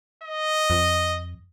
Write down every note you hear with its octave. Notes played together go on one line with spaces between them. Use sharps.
D#5
F2